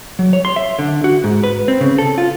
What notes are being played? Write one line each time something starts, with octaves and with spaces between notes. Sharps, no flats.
F#3
C#5
C6
E5
D3
F#4
G#2
B4
C4
C#3
A4
F4